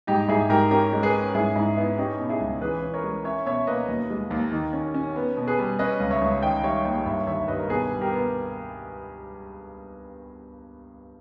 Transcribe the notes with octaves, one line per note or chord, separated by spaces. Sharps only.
G#2 D#4 G4
G#2 E4 G#4
G#2 G4 A#4
C#4 G4 A#4
G#3
G#4 B4
C#4
G#2 E4 G#4
G#2 E4
B3 E4
C#4 D#4 G4
B2
E4 G#4
C#2
E3 G#4 B4
C#4
A#4 C#5
G#3
C#4 C#5 E5
B2 C#5 E5
A#3 B4 D#5
D#2
G#3
D#2
D#3
C#4
C#4
B3
B2
G#4 B4
G3
C#4 B4 D#5
C#2
C#5 E5
C#2
D#3 D#5 G5
G3 C#5 E5
D#2 D#5 G5
G2 C#5 E5
D#3 C#5 E5
G2 B4 D#5
A#4
B2 G#4 B4
G3
G4 A#4
B3